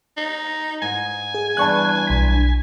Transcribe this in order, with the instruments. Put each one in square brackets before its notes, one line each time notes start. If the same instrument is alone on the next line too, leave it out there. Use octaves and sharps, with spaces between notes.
[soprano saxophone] D#4
[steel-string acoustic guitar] G#2 [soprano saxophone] G#5
[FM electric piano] G#4
[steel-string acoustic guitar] E2 G2 D4 [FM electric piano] A5 C#6 F#6
[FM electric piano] B1 B6